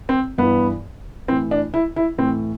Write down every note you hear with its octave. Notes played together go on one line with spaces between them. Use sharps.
C4
G2 E3 B3
A2 E3 C4
D4
E4
E4
A2 E3 C4